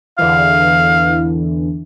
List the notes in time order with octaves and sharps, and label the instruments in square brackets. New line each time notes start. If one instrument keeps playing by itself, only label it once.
[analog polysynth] E2 D3 E3 [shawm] F5